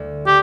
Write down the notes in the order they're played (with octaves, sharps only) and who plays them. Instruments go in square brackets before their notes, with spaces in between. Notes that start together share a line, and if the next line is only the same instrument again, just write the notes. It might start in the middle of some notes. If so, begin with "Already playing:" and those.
Already playing: [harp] D2
[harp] D3 C4 [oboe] G4